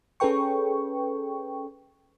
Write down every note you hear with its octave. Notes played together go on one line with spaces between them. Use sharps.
C#4 G#4 A4 B4 G5 C#6